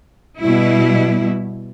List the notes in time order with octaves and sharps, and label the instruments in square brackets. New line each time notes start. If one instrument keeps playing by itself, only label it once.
[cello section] B2 G3 E4